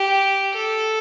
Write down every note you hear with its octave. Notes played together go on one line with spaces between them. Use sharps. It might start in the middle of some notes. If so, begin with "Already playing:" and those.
Already playing: G4
A4